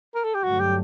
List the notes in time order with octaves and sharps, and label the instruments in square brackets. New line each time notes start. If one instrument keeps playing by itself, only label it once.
[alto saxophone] A#4
A4
G4
[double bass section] G2 D3 F#3 A3 [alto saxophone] F#4
[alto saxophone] G4